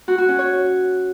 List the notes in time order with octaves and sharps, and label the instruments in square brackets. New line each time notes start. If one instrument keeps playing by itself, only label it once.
[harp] F#4
F#4
C#4
C#5